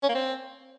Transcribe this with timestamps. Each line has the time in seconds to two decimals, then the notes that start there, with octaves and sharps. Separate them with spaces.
0.03 C#4
0.09 A#3
0.15 C4